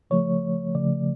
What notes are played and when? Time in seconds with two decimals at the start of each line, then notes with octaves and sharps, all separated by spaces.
0.10 C#3 F3 A3 C#5
0.75 C#3 F3 A3 D5